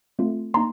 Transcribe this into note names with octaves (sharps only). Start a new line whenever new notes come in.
A3 C4 F4 A4
A#3 D#4 A#5 C6